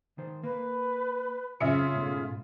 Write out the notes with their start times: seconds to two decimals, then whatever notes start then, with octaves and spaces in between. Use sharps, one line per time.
0.18 D#3 C5
0.44 A#3 B4
1.60 F#2 C#3 C4 F4 E5 C#7
1.95 G#2 B2 A3